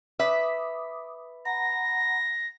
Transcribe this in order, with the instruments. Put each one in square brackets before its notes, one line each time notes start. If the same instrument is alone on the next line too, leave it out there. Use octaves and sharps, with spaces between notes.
[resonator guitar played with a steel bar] B4 E5 [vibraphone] D6 D#6
[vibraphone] F#5 A#5 B5 [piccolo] A#6